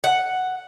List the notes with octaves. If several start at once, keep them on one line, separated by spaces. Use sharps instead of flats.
F#5